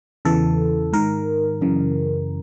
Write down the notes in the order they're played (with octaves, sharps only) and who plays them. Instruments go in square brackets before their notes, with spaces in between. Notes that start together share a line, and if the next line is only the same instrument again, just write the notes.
[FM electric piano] E2 C#3 E3 A4
G#2 D#3 A#4
F#2 C#3 E3